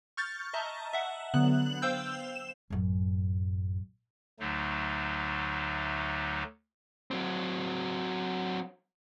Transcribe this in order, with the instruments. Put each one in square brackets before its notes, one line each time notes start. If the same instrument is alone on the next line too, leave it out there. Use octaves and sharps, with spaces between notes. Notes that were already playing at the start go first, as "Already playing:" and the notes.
[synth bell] C#6 F6 G6 A6
D#5 E5 A5 A#5
E5 F#5
D3 F#3 B3 F#6 F#7
C5 F5 G5 E6 G6
E7
[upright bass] A1 F#2
[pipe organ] D2 D3 F#3 A3 D#4
[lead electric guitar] F#3 C4